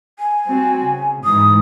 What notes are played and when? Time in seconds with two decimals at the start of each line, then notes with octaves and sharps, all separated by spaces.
0.19 G#5
0.48 G3 C4 F#4
0.83 C#3
1.24 G#2 E3 G#3 D#6